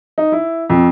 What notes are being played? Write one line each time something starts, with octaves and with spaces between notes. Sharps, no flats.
D#4
E4
F2